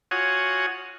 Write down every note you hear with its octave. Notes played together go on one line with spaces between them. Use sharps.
F4 F#4 C#5 F#5 G#5 D#6